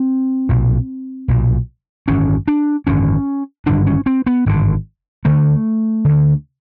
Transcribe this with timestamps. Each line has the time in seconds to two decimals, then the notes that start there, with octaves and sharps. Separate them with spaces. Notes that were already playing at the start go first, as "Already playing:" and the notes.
Already playing: C4
0.49 B1 A#2
1.28 B1 A#2
2.08 G#1 F#2 D3 C#4
2.48 D4
2.87 G#1 F#2 D3 C#4
3.66 G#1 G2 D3 D4
3.86 C#4
4.06 C4
4.27 B3
4.46 G#1 G2 D3
5.25 D2 D3 A3
6.05 D2 D3